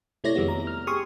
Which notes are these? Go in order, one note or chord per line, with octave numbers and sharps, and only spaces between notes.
C3 A3 E4 C#5 D5 A#6
F2 D#3 G3 G#3 B3
A#5
F6
G4 G#4 G#5 C6 C#6 D#6